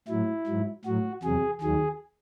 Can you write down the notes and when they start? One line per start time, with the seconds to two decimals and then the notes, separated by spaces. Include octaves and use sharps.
0.08 A2 F#3 E4
0.46 G#2 F#3
0.85 A2 F#3 F#4
1.23 E2 C3 F#3 G#4
1.61 D#2 D#3 F#3 G#4